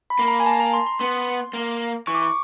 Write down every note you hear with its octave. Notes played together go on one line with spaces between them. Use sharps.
B5
A#3
A#5
G#5
A5
A#5
C6
C6
B3 C6
A#3
E3 C#6
D6
C#6